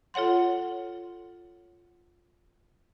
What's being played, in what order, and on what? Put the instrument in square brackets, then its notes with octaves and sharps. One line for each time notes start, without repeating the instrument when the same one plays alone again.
[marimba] F4 A4 C#5 F#5 C6